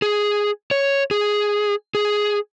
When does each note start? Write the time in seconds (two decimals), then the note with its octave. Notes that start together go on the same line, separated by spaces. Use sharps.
0.02 G#4
0.71 C#5
1.11 G#4
1.95 G#4